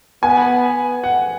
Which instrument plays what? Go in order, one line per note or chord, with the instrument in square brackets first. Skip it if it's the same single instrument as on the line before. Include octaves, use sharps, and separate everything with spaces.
[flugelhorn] B3 [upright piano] G#5
[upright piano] F#5